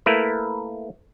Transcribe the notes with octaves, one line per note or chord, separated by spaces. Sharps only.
A3 A#3 E4 A#4 B4